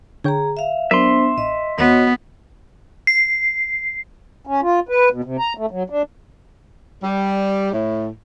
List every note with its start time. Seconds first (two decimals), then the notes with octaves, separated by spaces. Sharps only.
0.24 D3 G#4 C#5 G5 A#5
0.57 E5 F5
0.91 F#3 B3 D4 A#4 C5 D5 E5 C6
1.38 A1 D#5
1.79 D#2 B3 F#4 C#5 D#5
3.07 C7
4.47 C#4
4.62 F4
4.89 B4
5.11 B2
5.24 C3
5.39 A#5
5.57 A3
5.71 F#3
5.90 D4
7.03 G3
7.72 A2